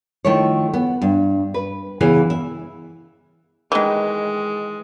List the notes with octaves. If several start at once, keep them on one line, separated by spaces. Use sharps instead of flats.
D#3 F3 A3 E4 C#5
B3
G2
B4
C#3 E3 B3 G#4
E5
D#3 E3 G#3